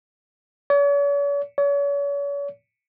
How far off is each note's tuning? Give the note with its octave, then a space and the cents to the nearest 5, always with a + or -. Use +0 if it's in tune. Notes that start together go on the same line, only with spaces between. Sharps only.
C#5 +45
C#5 +40